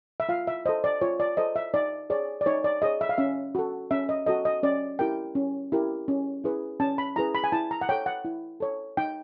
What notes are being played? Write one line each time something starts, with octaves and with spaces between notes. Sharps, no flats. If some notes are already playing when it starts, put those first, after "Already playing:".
E5
F4 F5
E5
A4 C5 D#5
D5
F4 C#5
D5
A4 C5 D#5
E5
D#4 D5
G#4 C#5 D5
D5
D#4 C#5
D5
G#4 C#5 D#5
E5
F5
C#4 E5
F#4 A4
C#4 E5
D#5
F#4 A4 D#5
D#5
C#4 D5
E4 G4 A#4 G5
C#4
E4 G4 A#4
C#4
E4 G#4 B4
C#4 A5
B5
E4 G#4 B4 A#5
B5
G#5
E4 A5
A#5
F#5
A4 C#5 G5
F#5
E4
A4 C#5
D#4 G5